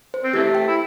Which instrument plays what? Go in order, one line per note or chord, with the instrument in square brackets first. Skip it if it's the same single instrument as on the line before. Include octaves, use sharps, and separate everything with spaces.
[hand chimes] C5
[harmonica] C4
[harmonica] C3 E3 A3 [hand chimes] G4
[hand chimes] G5
[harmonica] E4